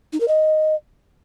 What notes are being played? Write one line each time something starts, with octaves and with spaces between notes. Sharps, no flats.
D#4
A#4
D#5